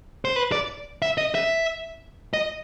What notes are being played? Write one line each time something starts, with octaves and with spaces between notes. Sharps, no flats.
C5
B4
D5
E5
D#5
E5
D#5